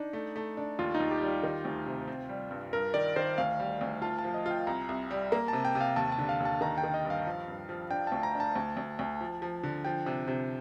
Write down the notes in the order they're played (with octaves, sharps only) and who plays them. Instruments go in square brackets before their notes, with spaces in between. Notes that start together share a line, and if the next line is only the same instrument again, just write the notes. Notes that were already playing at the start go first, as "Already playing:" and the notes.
Already playing: [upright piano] D4 [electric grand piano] D#4
[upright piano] A3
A3
D4
[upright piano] D#2 [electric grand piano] F4
[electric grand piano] D#4
[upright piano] D#2
[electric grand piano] G4
[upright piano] G3
[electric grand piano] F4
[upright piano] D#3
D2
C3
C4
G3
G2
[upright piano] G2 [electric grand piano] A#4
[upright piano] D#3 [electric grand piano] D5
[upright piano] D#3 [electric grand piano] C5
[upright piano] D2 [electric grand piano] F5
[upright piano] G3
D2
[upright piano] F4 [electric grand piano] A5
[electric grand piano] A5
[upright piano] F3
[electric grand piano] D#5
[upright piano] F4 [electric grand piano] G5
[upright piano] C2 [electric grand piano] A#5
[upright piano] C2
G3
[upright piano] A#3 [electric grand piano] A#5
[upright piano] C3 [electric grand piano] A5
[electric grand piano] G5
[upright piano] C3
[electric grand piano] F5
[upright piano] D#2 [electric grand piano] A5
[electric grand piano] A5
[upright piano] D3
[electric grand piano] F5
[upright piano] D#2
[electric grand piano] A5
[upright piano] D#3 [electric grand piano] A#5
[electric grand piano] G5
[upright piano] D#3
[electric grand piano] D#5
[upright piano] G2
[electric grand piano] F5
[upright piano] F3
G2
F3
[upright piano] D4 [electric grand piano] G5
[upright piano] D2 [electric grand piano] A5
[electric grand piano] A#5
[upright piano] D4
[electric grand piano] A5
[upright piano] D2
D2
D2
F3
F3
D3
[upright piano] F3 [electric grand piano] G5
[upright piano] C3
C3